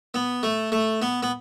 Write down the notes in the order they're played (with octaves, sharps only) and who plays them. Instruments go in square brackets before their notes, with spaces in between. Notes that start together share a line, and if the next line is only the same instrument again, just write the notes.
[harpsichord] B3
A3
A3
B3
B3